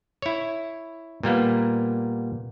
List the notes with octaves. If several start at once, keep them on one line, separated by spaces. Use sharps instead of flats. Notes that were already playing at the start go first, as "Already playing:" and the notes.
E4 C#5
A#2 G3 A#3 B3